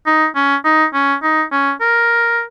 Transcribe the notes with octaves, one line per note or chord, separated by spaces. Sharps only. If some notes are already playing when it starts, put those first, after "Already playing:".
D#4
C#4
D#4
C#4
D#4
C#4
A#4